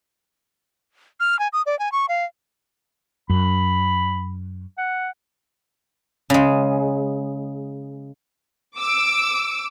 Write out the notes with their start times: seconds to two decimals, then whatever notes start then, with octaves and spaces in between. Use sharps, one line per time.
1.20 F6
1.39 G#5
1.53 D#6
1.66 D5
1.79 G#5
1.92 C#6
2.09 F5
3.30 F#2 B5
4.78 F#5
6.30 C#3 G#3
8.77 D6 E6 D7